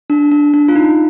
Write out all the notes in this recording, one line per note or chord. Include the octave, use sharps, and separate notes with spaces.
D4
D4
D4
F4
D#4